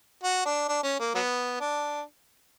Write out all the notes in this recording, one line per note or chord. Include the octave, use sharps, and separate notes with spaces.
F#4
D4
D4
C#4
A#3
F#3 B3
D4